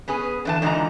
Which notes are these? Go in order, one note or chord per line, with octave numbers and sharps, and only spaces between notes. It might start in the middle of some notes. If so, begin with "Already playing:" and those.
B3 C#4 G#4 B4
D3 E3 A5
G#2 D3 E3 D#4 F4 A#5